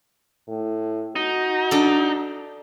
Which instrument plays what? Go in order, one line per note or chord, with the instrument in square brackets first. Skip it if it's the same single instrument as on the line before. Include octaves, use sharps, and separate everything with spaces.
[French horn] A2
[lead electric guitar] D#4 [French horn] F#4
[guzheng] D4 A4